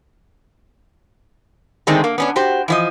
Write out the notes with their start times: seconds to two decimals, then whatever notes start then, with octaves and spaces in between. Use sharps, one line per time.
1.87 D3 D#3 G#3 A3 C4
2.04 A#3
2.18 B3 C#4 D4
2.36 F#4 G4 C5
2.68 E3 F3 D#5